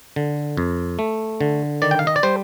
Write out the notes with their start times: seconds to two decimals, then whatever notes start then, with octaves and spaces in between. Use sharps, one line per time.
0.16 D3
0.57 F2
0.99 A3
1.41 D3
1.82 D#3 D5
1.91 G5
1.99 F5
2.07 D#5
2.16 D5
2.23 G3 C5